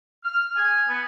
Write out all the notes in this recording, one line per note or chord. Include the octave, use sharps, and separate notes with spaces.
F6
G#5
B3